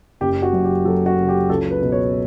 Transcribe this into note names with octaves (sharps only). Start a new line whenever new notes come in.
F#1 G4
F#4
F#2
G4
F#3 A4
F#4
C#3
G4
C#2 A4
B4
B2
C#5